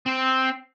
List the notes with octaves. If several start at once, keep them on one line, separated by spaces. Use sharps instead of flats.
C4